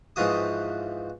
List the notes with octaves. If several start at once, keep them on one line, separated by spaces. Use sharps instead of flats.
G#2 E3 F3 F#4 D#6